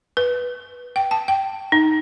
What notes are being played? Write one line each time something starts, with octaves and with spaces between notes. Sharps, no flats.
B4
G5
A5
G5
D#4